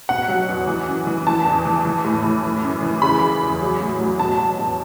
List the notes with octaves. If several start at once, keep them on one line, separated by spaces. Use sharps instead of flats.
B2 F#5
F#3
E2
E3
F#2
E3
E3 A5
E2
E3
E3
A2
E3
E3
F#2
E3
C#3 B5
E3
E2
F#3
A2
F#3
B2 A5
F#3
E2